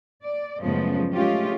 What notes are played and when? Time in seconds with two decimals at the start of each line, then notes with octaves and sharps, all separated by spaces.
0.23 D5
0.61 F#2 A2 C#3 F3 G#3 B3
1.13 G#3 A3 C#4 F4 G4